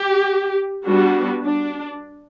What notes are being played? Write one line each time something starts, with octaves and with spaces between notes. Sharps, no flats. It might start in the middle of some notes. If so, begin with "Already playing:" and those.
Already playing: G4
G3 B3 D4 F#4
D4